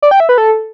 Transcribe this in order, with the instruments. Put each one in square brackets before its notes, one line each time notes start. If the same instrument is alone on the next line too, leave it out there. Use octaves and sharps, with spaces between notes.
[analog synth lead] D5
G5
E5
B4
A4